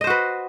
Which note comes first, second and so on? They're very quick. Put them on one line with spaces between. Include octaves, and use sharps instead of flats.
D#5 C5 F#4 B4